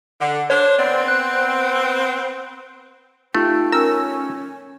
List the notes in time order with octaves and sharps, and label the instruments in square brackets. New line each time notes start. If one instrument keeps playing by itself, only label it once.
[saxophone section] D3
[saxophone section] D4 C5 [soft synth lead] C#5
[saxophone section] B3 C4 [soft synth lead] D5
[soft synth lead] F#6
[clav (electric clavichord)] A3 [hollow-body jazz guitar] D#4 F4 G4 [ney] G5
[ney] C#4 [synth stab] A#4 E6